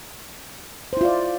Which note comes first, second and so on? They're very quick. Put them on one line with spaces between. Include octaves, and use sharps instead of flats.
C5 E4 F4 D5